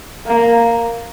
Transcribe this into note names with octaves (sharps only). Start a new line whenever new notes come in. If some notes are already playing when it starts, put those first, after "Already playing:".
A#3